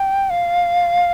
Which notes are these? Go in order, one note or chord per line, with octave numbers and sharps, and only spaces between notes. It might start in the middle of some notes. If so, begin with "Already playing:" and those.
Already playing: G5
F5